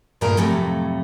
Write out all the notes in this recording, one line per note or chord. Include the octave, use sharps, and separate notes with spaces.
D2 G2 A#2 G#4 A#4
F2 A2 C3 F#3 A3